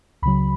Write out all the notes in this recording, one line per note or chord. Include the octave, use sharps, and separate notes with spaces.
C#2 C#3 F#3 B5